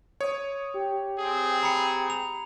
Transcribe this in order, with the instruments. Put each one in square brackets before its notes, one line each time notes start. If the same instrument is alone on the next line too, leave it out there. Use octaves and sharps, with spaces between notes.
[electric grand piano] C#5 [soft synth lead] D#6
[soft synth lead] G4
[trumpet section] C4 G#4
[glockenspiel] A#5 B5 C#7
F7